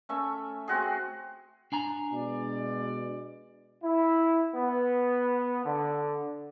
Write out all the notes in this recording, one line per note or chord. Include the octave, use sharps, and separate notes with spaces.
A3 C#4 E5
C4 F#4 G#4
D4 G#5 A#5
B2 G#3 D5
E4
B3
D3